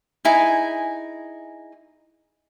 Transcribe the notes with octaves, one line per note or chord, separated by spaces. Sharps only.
D#4 E4 G#4 G#5